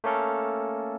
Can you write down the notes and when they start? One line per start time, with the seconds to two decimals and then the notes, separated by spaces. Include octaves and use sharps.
0.04 A3 A#3 C#4 A4 A#4